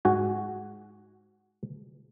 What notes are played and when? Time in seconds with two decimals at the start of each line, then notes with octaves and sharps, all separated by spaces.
0.05 G#2 F#4 G#5